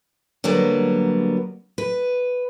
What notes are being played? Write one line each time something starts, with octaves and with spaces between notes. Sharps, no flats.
D3 F#3 G3 A#3 B3
B4